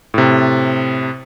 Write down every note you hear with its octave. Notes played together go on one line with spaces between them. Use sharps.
A2 C3